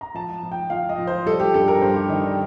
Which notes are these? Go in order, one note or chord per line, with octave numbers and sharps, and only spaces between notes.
A#5
F3 A5
F3
G5
F3 F5
D#5
F3
C5
G3 A4
G4
G2 A4
A#4
G2 C5
G4
D#3 D#4
D4